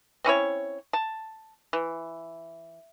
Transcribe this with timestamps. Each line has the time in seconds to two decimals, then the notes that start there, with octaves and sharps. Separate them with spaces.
0.24 C4 C#4 E4 C#5
0.93 A5
1.73 E3